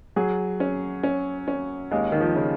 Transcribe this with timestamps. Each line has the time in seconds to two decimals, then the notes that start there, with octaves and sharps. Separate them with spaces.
0.16 F#3 G#4
0.60 C#4
1.03 C#4
1.48 C#4
1.91 D#2 G#3
2.12 D#3
2.20 F3
2.36 C#3